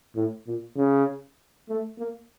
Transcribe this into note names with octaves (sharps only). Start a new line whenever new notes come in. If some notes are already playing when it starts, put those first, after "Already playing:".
A2
A#2
C#3
A3
A#3